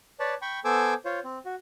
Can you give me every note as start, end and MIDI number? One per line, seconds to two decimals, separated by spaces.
0.20 0.34 71
0.20 0.34 73
0.20 0.34 74
0.20 0.34 81
0.42 0.60 79
0.42 0.60 83
0.42 0.60 85
0.65 0.94 59
0.65 0.94 69
0.65 0.94 72
0.65 0.94 80
0.65 0.94 86
0.65 0.94 88
1.05 1.19 65
1.05 1.19 72
1.05 1.19 73
1.24 1.39 60
1.45 1.55 66